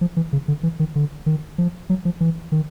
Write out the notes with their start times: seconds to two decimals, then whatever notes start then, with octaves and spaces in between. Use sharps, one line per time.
0.01 F3
0.17 E3
0.33 C#3
0.48 D3
0.63 E3
0.80 D#3
0.96 D3
1.26 D#3
1.58 F3
1.90 F#3
2.05 F3
2.20 E3
2.52 D#3